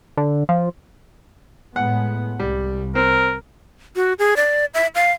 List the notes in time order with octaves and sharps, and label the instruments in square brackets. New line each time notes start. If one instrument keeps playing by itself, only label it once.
[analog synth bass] D3
F3
[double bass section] A2 G#3 B3 [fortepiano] F#5
[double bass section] C2 [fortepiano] G3
[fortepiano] C4 [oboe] A#4
[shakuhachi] F#4
G#4
D5
E5
F5